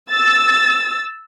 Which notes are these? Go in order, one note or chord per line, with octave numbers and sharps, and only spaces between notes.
E6 A6